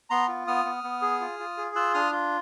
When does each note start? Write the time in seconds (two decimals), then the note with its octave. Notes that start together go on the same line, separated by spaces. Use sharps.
0.10 B3 A#5 C6
0.28 F4
0.47 B3 D#6 F6
0.65 B3
0.84 B3
1.02 G#4
1.21 F4
1.40 F4
1.57 G#4
1.75 F4 E6 F#6
1.94 D4 D#6 F6
2.12 F4